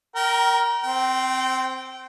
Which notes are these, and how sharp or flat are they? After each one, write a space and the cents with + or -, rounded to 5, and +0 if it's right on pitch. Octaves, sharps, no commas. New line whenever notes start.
A#4 +0 G5 -30 A#5 +25
C4 +0 G5 -30